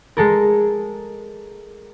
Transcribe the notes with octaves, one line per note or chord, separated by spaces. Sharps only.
G#3 A4 A#4